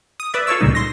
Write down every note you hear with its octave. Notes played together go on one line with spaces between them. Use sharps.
D#6
B4 D5 E5
F4 A4 C#5 C#6 E6
C#2 A#2 C#3 G3 D#4
C6 A#6